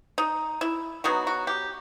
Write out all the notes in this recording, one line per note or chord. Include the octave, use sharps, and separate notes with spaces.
D#4
E4
F#3 B3 D#4 F#4
F#4
G4